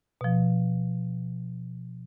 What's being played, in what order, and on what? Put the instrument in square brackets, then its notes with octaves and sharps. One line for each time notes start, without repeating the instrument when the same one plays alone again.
[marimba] B2 F3